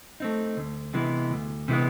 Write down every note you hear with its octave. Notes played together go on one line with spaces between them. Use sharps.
A3 C4 D#4
D2
C3 E3 G#3 B3
D2
C3 E3 G#3 B3